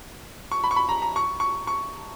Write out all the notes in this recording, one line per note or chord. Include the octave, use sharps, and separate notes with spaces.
C#6
B5
C#6
B5
A#5
A#5
C#6
C#6
C#6